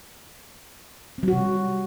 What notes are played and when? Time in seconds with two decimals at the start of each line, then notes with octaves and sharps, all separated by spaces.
1.18 C4
1.23 F#3
1.28 F#4
1.33 C3
1.37 G3